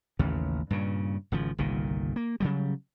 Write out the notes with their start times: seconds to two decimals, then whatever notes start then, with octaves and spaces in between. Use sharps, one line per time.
0.19 A1 D#2 C#3
0.70 G2 A#2 C#3
1.32 G#1 C#3 F3
1.58 G1 C2 A#2 D#3
2.16 A#3
2.40 C#3 F#3 G3